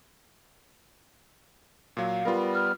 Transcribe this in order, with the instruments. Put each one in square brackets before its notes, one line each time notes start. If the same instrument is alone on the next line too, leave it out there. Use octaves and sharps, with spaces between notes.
[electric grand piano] A#2 F#3 [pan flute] F5
[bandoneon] G3 B3 [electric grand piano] F4 A#4
[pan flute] F6